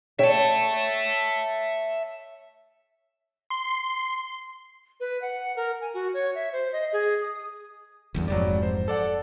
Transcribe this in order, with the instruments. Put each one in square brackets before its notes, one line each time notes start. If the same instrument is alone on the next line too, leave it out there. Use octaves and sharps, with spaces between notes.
[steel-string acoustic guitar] C#5 G5 [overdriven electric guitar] E5 A5
[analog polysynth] C6
[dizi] B4
F#5
A#4
G#5
F#4
C#5
E5
C5
D#5
G#4
D#6
[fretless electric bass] F1 E2 G2
[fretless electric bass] F1 F2 G#2 [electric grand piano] F#3 G3 D5
[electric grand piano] C5
A4 D5 F#5